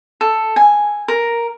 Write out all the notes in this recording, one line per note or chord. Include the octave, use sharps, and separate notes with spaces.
A4
G#5
A#4